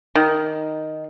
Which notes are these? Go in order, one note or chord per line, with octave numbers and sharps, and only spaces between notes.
D#3